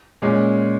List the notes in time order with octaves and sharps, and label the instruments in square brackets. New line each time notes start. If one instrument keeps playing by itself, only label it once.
[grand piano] A#2 G#3 C#4